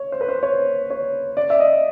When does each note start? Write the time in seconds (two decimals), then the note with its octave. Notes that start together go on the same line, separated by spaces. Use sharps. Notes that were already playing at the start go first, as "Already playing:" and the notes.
Already playing: C#5
0.12 C5
0.21 B4
0.29 C5
0.43 C#5
0.90 C#5
1.37 D5
1.50 E5
1.60 D#5